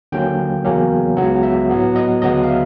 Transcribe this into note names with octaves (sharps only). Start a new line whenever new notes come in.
D#2 D3 F#3 A#3 C#4 G5
E2 C#3 F#3 A#3 C#4
C#2 C#3 F#3 B3 F#5
E5
A2 F#3 B3
D#5
D2 C#3 F#3 B3 D#5
F5
E5